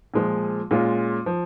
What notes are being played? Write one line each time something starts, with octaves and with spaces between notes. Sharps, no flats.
A#2 F3 G#3
A#2 G#3 C#4 F4
F3